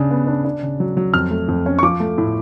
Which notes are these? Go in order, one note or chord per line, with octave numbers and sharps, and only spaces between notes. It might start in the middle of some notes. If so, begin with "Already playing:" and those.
Already playing: C#3 D4
B3
D4
D4
C#3
F#3
F#3
F2 F6
A3
F2
C#4
C#6
F3 D6
A3
A2